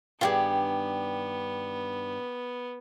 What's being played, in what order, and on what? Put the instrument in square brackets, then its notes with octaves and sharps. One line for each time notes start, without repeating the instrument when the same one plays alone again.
[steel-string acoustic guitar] G2 D#3 [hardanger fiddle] B3 [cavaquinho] F4 G4 G#4